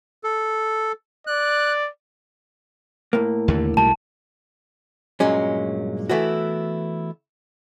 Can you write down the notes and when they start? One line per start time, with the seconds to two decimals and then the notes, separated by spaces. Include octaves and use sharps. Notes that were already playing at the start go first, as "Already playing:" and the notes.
0.24 A4
1.27 D5 F#6
3.13 A2 A#3
3.48 D#2 D3
3.77 B1 F#3 G3 A5
5.20 G2 A#2 F#3 G#3 C#4
6.09 E3 A3 B3 E4 F#4